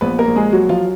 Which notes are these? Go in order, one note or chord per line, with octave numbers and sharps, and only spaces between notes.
A#1 B3 B4
A#3 A#4
A#1
G#3 G#4
F#3 F#4
F3 F4